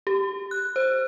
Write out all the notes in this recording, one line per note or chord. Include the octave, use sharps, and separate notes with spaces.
G4
F#6
C5